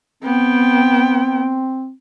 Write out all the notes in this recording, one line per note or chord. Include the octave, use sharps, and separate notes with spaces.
B3 C4 G5